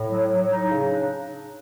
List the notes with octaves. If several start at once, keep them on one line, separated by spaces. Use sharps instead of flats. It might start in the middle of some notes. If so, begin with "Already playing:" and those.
Already playing: A2
F#3
F#3
D#4
C#3
D4